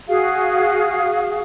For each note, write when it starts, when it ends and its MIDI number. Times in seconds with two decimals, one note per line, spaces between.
0.08 1.42 66
0.08 1.42 68
0.08 1.42 77